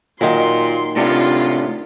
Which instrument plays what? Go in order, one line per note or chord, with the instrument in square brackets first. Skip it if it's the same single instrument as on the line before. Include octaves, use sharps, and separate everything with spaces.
[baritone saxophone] A#2 [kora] D#3 F#3 [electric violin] C6
[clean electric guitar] A2 D4 G4 [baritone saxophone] C3 [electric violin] F4